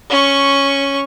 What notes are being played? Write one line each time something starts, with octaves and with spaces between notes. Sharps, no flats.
C#4 C#6